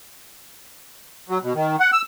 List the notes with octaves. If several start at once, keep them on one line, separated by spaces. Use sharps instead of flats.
F#3
B2
D#3
F#5
E6